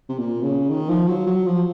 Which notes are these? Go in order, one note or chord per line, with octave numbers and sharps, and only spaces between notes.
C3
A#2
C#3
D#3
F3
F#3
F#3
F3